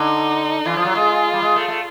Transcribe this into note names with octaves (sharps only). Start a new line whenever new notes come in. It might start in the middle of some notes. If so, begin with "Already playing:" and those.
Already playing: D3 D#4
E3 F4
F3
F#3
G#3
G3
G#3
A3
A3